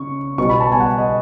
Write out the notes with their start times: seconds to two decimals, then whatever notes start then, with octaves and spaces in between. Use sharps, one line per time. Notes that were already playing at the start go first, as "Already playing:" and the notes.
Already playing: C#3 C#6
0.38 B2 G3 C#6
0.49 B5
0.60 A5
0.72 G#5
0.80 F#5
0.98 D#5